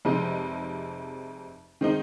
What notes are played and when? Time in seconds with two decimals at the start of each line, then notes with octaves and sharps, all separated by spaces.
0.05 F1 F2 C3 G#3 D#4
1.81 D#3 G#3 C4 D#4